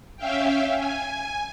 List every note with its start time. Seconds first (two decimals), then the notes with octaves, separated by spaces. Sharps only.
0.17 C#4 E5 F5 G5
0.75 G#5